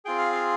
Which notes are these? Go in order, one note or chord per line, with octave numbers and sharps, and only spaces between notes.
C4 F4 G#4 G5
F5
F5